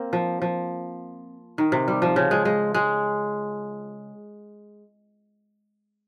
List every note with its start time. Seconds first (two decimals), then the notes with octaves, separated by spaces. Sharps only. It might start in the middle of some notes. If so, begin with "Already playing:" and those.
Already playing: A#3 C4
0.13 F3
0.42 F3
1.58 D#3
1.72 C3
1.88 G3
2.02 F3
2.16 C#3
2.31 G#3
2.45 G#3
2.74 G#3